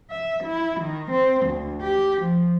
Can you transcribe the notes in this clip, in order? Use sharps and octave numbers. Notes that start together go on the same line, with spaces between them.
E5
E4
D#3
C4
D2
G4
F3